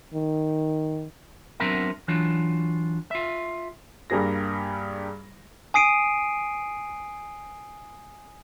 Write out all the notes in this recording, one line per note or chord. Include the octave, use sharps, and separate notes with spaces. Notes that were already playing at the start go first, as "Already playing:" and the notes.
D#3
F#3 B3 C4 D4 A#4 E5
E3 F#3 D4 F4
F4 E5
G2 G3 A#3 G#4 A#6
G#5 D#6 C7 D7 D#7